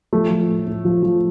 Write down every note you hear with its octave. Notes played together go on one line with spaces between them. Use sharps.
F3 A3
F3
A2
A2
F3
F3